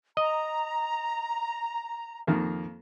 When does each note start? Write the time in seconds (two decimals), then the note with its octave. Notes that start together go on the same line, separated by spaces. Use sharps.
0.17 D#5 A#5
2.27 F2 D#3 A#3